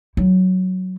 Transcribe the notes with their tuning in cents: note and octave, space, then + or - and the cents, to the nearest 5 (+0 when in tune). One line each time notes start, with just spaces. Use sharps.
F#3 +0 E4 -40